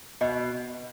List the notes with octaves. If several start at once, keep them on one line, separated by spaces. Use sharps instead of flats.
B2 D#5